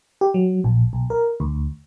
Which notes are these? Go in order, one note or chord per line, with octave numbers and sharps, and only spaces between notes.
G4
F#3
A#1
B1
A#4
D2